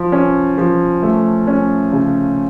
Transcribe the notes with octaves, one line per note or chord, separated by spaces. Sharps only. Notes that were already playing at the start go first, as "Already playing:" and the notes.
Already playing: F3
C#4
F3
A3
C#4
C#3